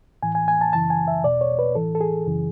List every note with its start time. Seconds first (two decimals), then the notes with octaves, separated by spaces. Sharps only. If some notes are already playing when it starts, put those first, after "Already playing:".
0.23 A2 E3 G#5
0.35 G#5
0.48 G#5
0.61 A5
0.73 F#2 C#3 E3 A5
0.90 G#5
1.08 E5
1.24 E2 B2 D5
1.41 C#5
1.59 B4
1.75 A2 E3 A4
1.95 A4
2.01 G#4
2.26 F#2 C#3 E3